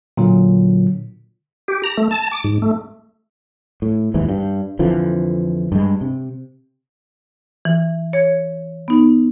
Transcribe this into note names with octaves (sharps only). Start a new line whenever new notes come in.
A#2 D3 F#3
G4
A#5
A3
A5
D6
G#2
A3
A2
D#2 G#2 E3
G2
F2 D3 E3 F3
G2 G#3
C3
E3
C#5 G#6
B3 D#4